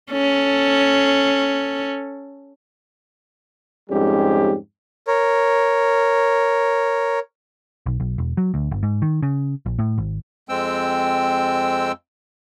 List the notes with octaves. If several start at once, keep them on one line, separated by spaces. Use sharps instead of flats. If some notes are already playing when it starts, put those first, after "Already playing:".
C#4 A4
F2 G#2 G3 C#4 G4
A#4 C#5
B1
B1
E1
F#3
D2
G1
G#2
D#3
C#3
A#1
A2
G#1
F2 G#3 C4 G5 E6